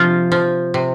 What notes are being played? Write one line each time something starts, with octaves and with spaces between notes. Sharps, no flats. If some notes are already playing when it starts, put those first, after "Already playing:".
Already playing: C3 F3 F4
F3
C3